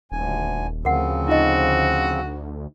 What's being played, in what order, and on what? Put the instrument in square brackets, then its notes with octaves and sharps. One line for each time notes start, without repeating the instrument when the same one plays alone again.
[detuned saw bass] D#1 [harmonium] D2 G#5
[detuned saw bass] D2 [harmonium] C#3 F3 C4 [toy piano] A#4 F#5
[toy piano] D#4 F4 D#5 [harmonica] F#4